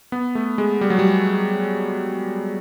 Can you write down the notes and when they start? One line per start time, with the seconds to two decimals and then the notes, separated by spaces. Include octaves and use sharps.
0.12 B3
0.35 A3
0.58 G#3
0.81 G3
0.90 F#3
0.99 G3